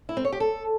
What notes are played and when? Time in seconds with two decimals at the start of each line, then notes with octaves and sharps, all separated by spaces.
0.09 E4
0.17 C4
0.25 C#5
0.32 G4
0.40 A4